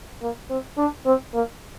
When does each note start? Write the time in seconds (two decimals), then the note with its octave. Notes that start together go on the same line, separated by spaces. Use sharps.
0.22 A#3
0.49 C4
0.78 D4
1.06 C4
1.34 A#3